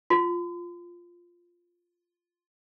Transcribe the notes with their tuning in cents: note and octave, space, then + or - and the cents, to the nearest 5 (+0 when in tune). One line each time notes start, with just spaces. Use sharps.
F4 +0 C6 -45